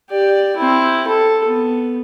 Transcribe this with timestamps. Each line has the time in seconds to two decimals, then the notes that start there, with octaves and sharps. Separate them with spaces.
0.10 G4 D5
0.56 C4 E4
1.07 A4
1.46 B3